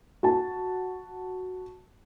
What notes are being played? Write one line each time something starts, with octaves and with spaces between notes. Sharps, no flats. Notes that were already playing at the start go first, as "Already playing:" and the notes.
F#4 A5